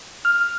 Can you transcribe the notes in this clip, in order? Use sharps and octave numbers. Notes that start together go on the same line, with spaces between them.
F6